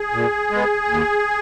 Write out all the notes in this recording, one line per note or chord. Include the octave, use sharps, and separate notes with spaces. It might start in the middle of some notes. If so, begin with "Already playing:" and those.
Already playing: G#4
A#2
G#3 B3
D#2